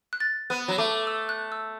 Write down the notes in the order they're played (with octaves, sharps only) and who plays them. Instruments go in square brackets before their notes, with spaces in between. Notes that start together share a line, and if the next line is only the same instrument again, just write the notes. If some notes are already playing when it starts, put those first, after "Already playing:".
[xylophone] F#6
A6
[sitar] B3 [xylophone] F#6
[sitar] F#3
[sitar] A3 [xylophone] D6
[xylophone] E6
F#6
E6